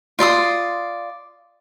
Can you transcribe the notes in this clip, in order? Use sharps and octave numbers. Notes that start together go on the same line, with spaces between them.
F4 D5 C6 D#6